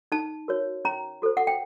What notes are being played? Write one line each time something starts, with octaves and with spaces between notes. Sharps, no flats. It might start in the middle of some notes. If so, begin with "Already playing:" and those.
D#4 A5
F#4 A#4 C#5
C#4 A#5
F#4 A4 C5
F#5
G5